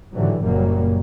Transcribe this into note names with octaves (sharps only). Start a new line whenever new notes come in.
G#2 D3 E3 F#3 G3
F#1 F#2 A#2 F#3 G3 A#3